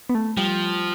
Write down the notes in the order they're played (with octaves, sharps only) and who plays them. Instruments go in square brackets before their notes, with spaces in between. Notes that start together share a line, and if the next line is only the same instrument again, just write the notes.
[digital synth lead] B3
A3
[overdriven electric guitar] F3 [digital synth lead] G3